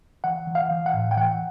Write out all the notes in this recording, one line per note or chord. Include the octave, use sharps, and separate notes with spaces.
E3 F#5
E3
F5
E3
F#5
A2
G5
E3 F#5